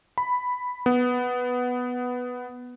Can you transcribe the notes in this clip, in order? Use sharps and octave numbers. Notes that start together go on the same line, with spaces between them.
B5
B3